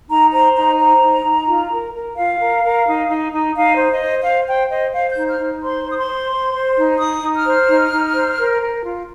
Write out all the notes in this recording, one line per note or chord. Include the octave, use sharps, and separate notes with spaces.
D#4 A#5
C5 A#5
D#4 A#5
C5 A#5
D#4
D#4
F4
A#4
A#4
F4 F5
A#4
A#4
D#4
D#4
D#4
D#4 F5
C5
D#5
C5
C5 F5
C5 G5
C5 D#5
C5 F5
G6
D#4
F6
D#4
C5 C6
C5 D#6
C6
C5
C5
C5
D#4
D#4 D#6
D#4
F6
C5
D#4
D#4
C5
A#4
A#4
F4